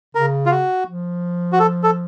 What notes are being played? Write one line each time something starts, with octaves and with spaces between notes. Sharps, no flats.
C#3 A#4
F4
F#4
F3
F#4
A4
A4